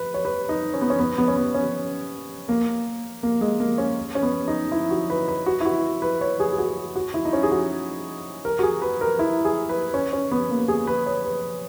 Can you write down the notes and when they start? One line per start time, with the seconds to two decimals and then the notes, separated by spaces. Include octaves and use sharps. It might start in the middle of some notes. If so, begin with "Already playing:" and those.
Already playing: B4
0.14 C#5
0.25 B4
0.49 D#4
0.74 C#4
0.81 B3
0.90 C#4
0.99 B3
1.18 B3
1.28 C#4
1.36 B3
1.54 C#4
2.49 A#3
3.23 A#3
3.41 G#3
3.60 A#3
3.78 C#4
4.15 C#4
4.22 B3
4.48 D#4
4.72 E4
4.91 F#4
5.10 B4
5.28 B4
5.46 F#4
5.61 E4
5.66 F#4
6.02 B4
6.21 C#5
6.40 G#4
6.53 G#4
6.58 F#4
6.96 F#4
7.14 E4
7.25 D#4
7.33 C#4
7.43 G#4
7.52 F#4
8.45 A#4
8.59 F#4
8.63 G#4
8.82 B4
9.01 A#4
9.19 E4
9.45 G#4
9.69 B4
9.94 C#4
10.13 C#4
10.31 B3
10.50 A#3
10.68 G#4
10.87 B4
11.06 C#5
11.24 B4